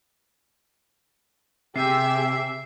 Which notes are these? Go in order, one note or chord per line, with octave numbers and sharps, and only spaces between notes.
C3 G4 G#4 E5 C7